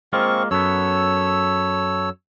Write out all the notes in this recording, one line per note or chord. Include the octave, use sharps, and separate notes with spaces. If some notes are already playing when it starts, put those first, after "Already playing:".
G#3 A#3 C4 F4 C#6
F#2 B3 A4 C#5 E6